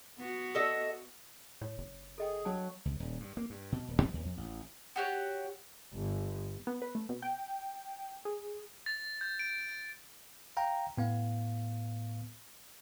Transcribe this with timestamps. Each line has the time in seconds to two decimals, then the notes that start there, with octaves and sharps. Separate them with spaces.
0.19 B3 F#4
0.55 A4 D#5 E5
1.61 A2 C#5
1.78 F#1
2.18 G#4 A4 D#5 G5
2.45 F#3 D4 G5 A5
2.85 C#2
3.00 D#1
3.20 G2
3.37 A#3
3.50 G2
3.72 B2
3.88 D#1
4.02 F2
4.14 D#2
4.25 F2
4.37 A1
4.96 F#4 G4 C#5
5.93 G1
6.67 B3
6.82 B4
6.95 A3
7.09 B2
7.22 G5
8.25 G#4
8.86 A6
9.21 G6
9.39 D7
10.57 F5 G5 A#5
10.97 A2 B3 F5